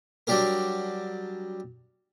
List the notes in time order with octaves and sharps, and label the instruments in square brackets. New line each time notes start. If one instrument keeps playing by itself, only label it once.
[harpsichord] F#3 G3 D4 G4 A#4